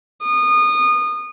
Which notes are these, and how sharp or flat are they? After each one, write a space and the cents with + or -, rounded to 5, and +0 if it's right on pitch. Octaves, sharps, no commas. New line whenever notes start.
D#6 -25